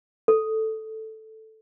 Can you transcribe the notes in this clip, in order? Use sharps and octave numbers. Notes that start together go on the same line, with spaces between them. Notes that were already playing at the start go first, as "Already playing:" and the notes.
A4